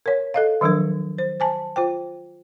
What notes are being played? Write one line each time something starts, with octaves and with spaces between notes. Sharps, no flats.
A#4 C#5
A4 D#5 F5
D#3 F3 F#3 D4 A#4
C5
C5 G#5 A5
F4 C5 G5